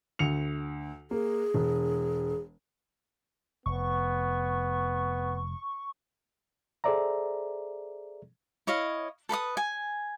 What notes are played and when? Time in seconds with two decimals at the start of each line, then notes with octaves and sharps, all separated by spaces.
0.19 D2 C#7 F7
1.11 A#3 G#4
1.54 E1
3.66 F1 B3 C#6
6.84 G#4 A4 C5 D5 E5 A#5
8.67 E4 C#5 D#5 F5
9.29 A4 B4 B5 D#6
9.57 G#5